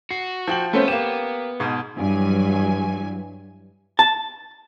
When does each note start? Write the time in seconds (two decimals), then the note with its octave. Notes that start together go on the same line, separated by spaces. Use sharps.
0.11 F#4 C7
0.47 F3 G5 F#7
0.73 A3 B3 C#4 C5
0.88 A#3 G4 E7
1.60 G#2 B2
1.95 G2 E3 F#3 G#5
3.99 A5